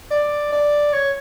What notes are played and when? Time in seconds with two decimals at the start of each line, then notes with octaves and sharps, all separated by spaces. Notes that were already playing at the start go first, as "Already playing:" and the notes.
0.11 D5
0.52 D5
0.93 C#5